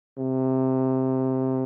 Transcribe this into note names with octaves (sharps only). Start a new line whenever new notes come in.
C3